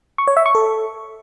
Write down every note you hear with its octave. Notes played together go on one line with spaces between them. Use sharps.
C#6
C#5
E5
C#6
A4